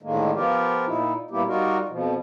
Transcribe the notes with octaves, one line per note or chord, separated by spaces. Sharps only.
A2 D3 D#3 G#3 A#3
F3 B3 F4 G4 A#4
A#2 D#4 E4
A#2 G3 A#3 B3 E4 G4
G3 D#4 F4 F#4 A#4
F2 B2 F3